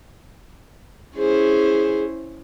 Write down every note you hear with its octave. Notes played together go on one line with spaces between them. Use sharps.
C#4 E4 G#4 C5